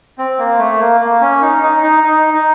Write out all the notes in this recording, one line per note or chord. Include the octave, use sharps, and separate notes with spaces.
C4
A#3
A3
A#3
A#3
C#4
D#4
D#4
D#4
D#4
D#4